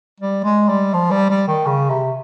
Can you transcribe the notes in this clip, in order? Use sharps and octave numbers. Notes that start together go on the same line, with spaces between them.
G3
G#3
G3
F3
G3
G3
D#3
C#3
C3